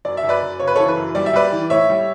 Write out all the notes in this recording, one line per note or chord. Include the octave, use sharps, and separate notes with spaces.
F#2 D5
E5
F#2
B4 D5
F#2
C#3 C#5
B4
A4 C#5
E3
B4
F#2
G3 D5
E5
G3 B4 D5
E3
A2 C#5 E5
G3